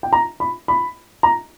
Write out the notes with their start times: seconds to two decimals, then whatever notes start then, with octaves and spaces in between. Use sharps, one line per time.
0.03 G5
0.13 A#5
0.40 B5
0.68 B5
1.23 A#5